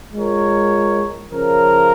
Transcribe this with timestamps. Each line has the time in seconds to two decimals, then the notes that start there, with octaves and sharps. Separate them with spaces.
0.14 G#3 F4 A#4 C#5
1.30 C#3 F3 C#4 A#4